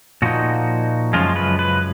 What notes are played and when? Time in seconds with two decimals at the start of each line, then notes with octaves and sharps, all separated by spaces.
0.22 A#2 F3 A#3 D#4 F#4
1.13 F#2 C#3 F3 G#3 F4
1.36 B4
1.59 B4